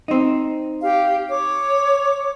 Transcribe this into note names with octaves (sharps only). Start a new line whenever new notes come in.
C4 D#4
G4 F5
C#5 D6